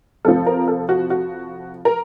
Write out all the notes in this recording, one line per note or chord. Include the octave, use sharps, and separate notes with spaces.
F2 C3 F3 A4
A#4
A4
F#4
F#4
A#4